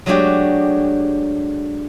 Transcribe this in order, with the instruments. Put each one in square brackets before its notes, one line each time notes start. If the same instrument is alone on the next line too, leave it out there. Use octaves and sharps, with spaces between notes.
[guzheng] F#3 G#3 A3 D4 F#4 G4